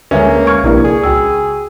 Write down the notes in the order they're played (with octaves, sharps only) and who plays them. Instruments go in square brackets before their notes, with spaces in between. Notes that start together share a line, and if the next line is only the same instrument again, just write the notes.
[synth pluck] D2 D3 G#3 [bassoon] A#3 [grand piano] C#4 [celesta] B4 E5 G#5
[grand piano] C#6 [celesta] F6 G#6
[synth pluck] A#1 C3 A#3 [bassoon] G2 [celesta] D4 E4 A#4
[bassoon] G#4
[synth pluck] C#2 [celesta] F#4 G5 E6